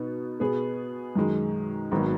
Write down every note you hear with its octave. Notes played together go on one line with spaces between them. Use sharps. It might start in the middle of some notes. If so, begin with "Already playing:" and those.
Already playing: B2 B3 D#4
B2 B3 G#4
F#2 D#3 G#3
G#1 G#2 D#3 F#3 B3